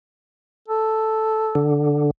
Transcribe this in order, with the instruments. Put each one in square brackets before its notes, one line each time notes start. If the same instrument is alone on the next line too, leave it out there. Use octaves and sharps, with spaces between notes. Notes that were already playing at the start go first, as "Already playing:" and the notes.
[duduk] A4
[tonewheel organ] D3